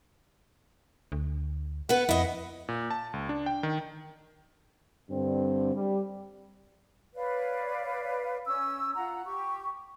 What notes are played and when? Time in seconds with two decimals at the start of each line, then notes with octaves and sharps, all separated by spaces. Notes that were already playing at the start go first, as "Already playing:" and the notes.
1.12 D2
1.89 B3 B4 F#5
2.09 F2 E4 D#5
2.68 A#2
2.91 A5
3.13 C#2
3.29 D4
3.46 G5
3.63 D#3
5.10 G2 D3 C4
5.75 G3
7.15 B4 C#5 D5 F5
8.46 C#4 E6
8.95 F4 F#5 A#5
9.25 G4 C#6